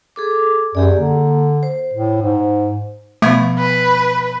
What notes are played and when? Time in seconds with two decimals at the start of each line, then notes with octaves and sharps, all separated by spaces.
0.16 G#4 A4 D6
0.75 F#2 G4 G#4 D5
0.97 D3 A#3
1.63 C5
1.93 A2
2.22 G#2
3.22 B2 F3 A3 B3
3.58 B4